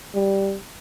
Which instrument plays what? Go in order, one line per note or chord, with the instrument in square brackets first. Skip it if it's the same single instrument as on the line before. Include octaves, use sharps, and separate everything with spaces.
[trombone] G3